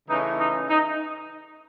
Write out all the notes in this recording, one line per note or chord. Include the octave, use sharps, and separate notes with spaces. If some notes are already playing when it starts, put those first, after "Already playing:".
C#3 E3 A3 C#4 D#4
D#4
D#4